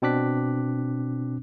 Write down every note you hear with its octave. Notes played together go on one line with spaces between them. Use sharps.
B2 C4 D4 D6 F#6 B6